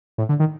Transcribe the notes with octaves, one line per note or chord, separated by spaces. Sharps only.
A2
D3
D#3